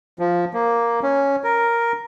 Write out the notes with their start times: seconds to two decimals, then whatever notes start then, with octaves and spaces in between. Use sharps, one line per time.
0.19 F3
0.54 A#3
1.03 C#4
1.44 A#4